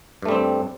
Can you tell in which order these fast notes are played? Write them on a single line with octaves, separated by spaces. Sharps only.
G2 A3 G3 C4